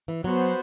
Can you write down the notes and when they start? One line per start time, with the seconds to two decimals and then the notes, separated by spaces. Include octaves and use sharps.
0.08 E3
0.24 F#3 B3 F#4 C5